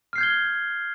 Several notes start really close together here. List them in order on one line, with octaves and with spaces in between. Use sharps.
F6 C7 G6 G#6 G7